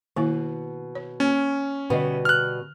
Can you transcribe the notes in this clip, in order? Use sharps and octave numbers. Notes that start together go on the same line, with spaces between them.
B2 D#3 A#3 E4
C#5
A#3 C#4
B2 D3 G3 B3 D#5
F6 F#6